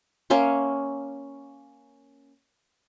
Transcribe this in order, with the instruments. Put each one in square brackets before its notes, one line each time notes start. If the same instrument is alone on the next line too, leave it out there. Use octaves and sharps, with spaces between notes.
[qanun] A#3 C#4 E5 C6